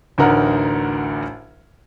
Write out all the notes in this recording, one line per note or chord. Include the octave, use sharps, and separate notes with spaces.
A1 D2 D3 D#4 A#4 F#5